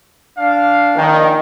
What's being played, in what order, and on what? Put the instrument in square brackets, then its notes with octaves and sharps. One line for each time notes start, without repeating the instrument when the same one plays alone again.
[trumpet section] D4 F5
[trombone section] A#1 D#3